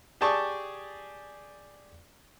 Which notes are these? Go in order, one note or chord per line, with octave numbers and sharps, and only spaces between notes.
G4 G#4 D5 A5 C#6